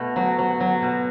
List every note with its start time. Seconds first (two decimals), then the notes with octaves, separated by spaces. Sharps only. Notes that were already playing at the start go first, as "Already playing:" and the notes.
Already playing: B2 A3
0.16 F#3
0.39 F#3
0.60 F#3
0.82 B2